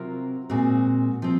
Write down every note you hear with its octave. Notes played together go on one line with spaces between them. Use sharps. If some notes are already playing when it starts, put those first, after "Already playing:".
Already playing: C3 F#3 C4 F4 A#4
A#2 G#3 C4 F#4
F3 C4